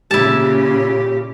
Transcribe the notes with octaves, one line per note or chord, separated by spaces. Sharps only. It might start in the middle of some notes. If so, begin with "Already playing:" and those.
A#2 C#3 E4 G4 A5